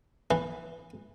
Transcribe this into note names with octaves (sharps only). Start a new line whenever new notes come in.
E3